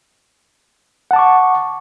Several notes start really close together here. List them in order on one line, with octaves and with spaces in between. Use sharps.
F#5 A5 D6 C#6